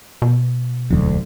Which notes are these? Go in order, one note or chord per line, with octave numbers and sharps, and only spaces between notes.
B2
E1 D2 F#3